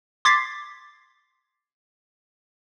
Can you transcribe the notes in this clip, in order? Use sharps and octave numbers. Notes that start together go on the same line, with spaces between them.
C6 D6 G#6 A6 B6 C7